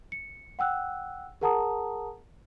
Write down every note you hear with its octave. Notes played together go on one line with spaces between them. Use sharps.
C#7
F#5 G5 E6 F#6
G#4 A#4 F#5 A5 A#5 D#6